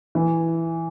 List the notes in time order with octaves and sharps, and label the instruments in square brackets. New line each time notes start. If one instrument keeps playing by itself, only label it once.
[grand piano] E3